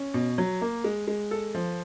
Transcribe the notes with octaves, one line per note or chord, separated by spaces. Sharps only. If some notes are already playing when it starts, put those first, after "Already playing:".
Already playing: C#4
B2
F#3
A#3
G#3
G#3
A4
F3